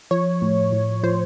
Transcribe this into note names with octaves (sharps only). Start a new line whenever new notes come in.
F3 C#5
A2
A2
F3 C5